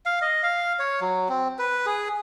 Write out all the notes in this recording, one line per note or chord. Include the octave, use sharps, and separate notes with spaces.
F5
D#5
F5
C#5
F#3
C4
B4
G#4